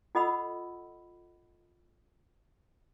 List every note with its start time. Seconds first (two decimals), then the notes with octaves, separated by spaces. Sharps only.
0.15 F4 A4 D#5 F#5 B5 E6